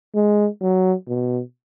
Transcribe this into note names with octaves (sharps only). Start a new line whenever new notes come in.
G#3
F#3
B2